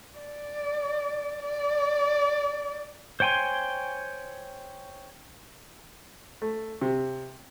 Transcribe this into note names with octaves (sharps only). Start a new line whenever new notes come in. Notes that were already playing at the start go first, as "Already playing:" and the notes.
D5
D5
C5 C#5 G5 G#5 C6
A3
C3